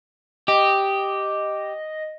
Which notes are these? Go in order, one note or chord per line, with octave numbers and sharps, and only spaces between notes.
G4 D#5